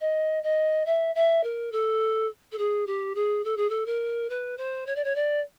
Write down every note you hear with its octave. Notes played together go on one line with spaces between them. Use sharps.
D#5
D#5
E5
E5
A#4
A4
A4
G#4
G4
G#4
A4
G#4
A4
A#4
B4
C5
C#5
D5
C#5
D5